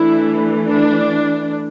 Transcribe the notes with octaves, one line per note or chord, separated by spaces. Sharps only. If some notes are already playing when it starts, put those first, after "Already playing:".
Already playing: E3 A3 D4 E4
D4